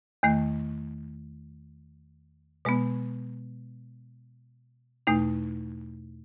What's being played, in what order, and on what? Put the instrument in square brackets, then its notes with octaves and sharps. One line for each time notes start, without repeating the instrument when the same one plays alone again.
[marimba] E2 D#3 A3
B2 G#3 B3
E2 B2 A3 D#4